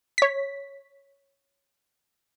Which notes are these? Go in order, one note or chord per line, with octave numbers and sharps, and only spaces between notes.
C#5 B6